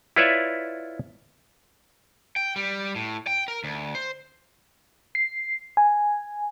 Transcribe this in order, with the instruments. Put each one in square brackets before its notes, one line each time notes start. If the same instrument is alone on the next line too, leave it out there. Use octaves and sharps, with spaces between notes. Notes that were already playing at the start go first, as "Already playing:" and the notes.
[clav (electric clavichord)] E4 F4 B4 C#5 D5 E5
[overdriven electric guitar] G5
G3
A2
G5
A#4
D2
C5
[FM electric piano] C7
G#5